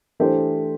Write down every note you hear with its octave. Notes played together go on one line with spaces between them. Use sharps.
E3 A3 D4 G4 C5